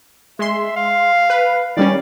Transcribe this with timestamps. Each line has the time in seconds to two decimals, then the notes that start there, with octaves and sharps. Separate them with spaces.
0.39 G#3 E5 C6
0.76 F5
1.30 B4
1.77 D#3 G3 C#4 D5